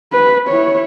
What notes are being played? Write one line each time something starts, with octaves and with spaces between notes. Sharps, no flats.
B4
E4 C#5